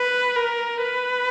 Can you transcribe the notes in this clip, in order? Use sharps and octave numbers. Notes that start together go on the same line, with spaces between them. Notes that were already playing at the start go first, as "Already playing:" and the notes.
Already playing: B4
A#4
B4